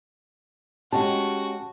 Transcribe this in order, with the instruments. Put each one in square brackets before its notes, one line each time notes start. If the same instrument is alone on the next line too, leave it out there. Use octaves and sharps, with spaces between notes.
[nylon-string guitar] G#3 C#4 G4 [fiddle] F#4 [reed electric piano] A5